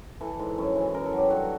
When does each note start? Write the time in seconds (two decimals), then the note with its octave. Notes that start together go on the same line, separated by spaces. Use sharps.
0.21 E3 A4
0.39 G#2
0.58 F#2
0.76 E3
0.94 F#2 A#4
1.06 A4
1.13 F#3 G4
1.30 G2 F#4